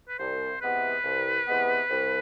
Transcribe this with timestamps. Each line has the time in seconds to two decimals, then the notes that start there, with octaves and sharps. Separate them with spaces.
0.08 B4
0.19 C2 C5
0.61 C3 E3 G#3 B3 B4
1.04 C2
1.47 C3 E3 G#3 B3
1.90 C2